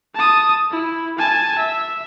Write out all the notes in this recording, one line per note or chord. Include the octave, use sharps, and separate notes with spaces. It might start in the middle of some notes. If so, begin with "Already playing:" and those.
A5 D#6
E4
G#5 A5
E5